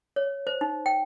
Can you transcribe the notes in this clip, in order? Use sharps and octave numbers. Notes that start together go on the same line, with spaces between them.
C#5
C5
D#4
G5